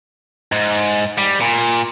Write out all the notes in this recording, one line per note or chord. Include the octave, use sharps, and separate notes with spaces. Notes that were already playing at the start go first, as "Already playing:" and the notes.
G#2
G3
A#2